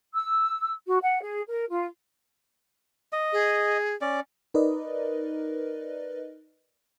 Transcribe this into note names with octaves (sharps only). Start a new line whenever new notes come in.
E6
F#4
F#5
G#4
A#4
F4
D#5
G#4
C#4 D5
D#4 A#4 B4 D5 D#5